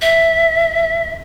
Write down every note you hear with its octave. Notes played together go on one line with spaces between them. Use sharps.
E5